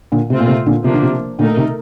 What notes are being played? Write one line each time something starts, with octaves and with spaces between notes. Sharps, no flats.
A#2 D3
C3 A3 C4 F4
A#2
C3
A#2 D3
C3 F3 A#3 D4
D3
C3
A#2 D3 A3 D#4 A#4
C3 D#3